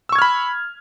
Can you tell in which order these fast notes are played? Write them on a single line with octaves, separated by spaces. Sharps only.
E6 C#6 G#6 F6 B5